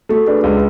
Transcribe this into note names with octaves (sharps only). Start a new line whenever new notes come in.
A3 F#4 A4
D4 G#4 B4
C#2